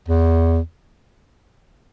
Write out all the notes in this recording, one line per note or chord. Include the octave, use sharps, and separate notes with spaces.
E2